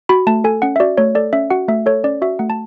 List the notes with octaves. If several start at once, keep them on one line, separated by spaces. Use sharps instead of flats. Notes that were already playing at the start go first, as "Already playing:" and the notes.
F#4 B5
A3 A5
A4 G#5
C#4 F#5
E5
F#4 D5
A3 C#5
A4 D5
C#4 E5
F#4 F#5
A3 E5
A4 C#5
C#4 D5
F#4 E5
A3 F#5
A5